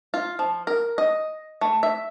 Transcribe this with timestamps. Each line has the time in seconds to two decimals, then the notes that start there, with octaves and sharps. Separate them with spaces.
0.14 F4
0.39 F3
0.67 A#4
0.98 D#5
1.61 A3
1.83 E5